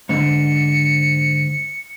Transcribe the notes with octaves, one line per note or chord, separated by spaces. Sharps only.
G#2 D3 C#7